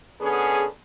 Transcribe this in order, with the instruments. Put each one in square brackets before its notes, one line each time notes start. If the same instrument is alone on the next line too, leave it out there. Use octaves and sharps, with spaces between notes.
[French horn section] D3 B3 C#4 G#4